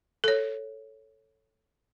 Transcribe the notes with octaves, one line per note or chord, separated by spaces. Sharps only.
A4 C#5